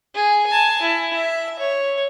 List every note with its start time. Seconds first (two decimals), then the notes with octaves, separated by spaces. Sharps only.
0.15 G#4
0.47 G#5 A5
0.82 E4
1.14 E5
1.59 C#5